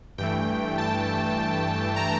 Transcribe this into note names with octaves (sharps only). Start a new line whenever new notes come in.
G2 E3 A3 G5
A5
A#5